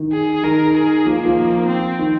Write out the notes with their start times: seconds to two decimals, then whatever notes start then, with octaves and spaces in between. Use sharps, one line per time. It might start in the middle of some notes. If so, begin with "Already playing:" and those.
Already playing: D#3
0.13 G#4
0.43 D#3 A#4
0.75 G#4
1.05 F3 A#3
1.16 D#3
1.26 F3
1.67 C4
1.99 D#3